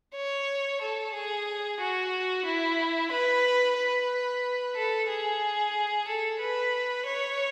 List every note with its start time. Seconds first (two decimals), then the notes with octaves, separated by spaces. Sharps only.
0.15 C#5
0.81 A4
1.14 G#4
1.80 F#4
2.45 E4
3.11 B4
3.77 B4
4.76 A4
5.08 G#4
6.08 A4
6.40 B4
7.06 C#5